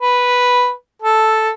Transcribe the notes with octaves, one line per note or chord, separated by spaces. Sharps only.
B4
A4